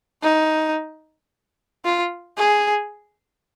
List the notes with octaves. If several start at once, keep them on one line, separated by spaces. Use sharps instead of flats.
D#4
F4
G#4